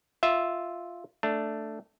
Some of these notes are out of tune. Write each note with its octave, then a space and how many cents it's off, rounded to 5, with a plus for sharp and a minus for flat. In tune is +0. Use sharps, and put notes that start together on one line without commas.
F4 +0 E5 -5
A3 +0 D4 +0